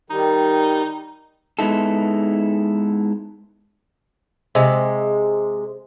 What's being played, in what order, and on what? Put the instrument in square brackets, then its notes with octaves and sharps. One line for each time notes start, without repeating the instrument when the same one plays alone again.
[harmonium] D#3 G3 [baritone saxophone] D#4
[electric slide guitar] G#3 B3 D#4 E4 A4
[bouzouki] C3 G#3